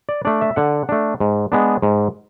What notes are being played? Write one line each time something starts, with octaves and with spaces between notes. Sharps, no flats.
D5
A3 D4 D5
E5
D3 F#5
A3 D4
G#2
G#3 B3 D4
G#2